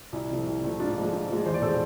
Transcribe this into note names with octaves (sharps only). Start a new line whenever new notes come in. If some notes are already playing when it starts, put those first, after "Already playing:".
C2 E4
C3 F3 A3
C2
C3 F3 A3
G#2 D4 F4
F3 G#3
G#2
F3 G#3
E2 C5
D5
B2 G#3 A4 C5